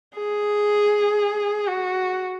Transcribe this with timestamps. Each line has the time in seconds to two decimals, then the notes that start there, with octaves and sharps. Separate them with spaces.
0.15 G#4
1.68 F#4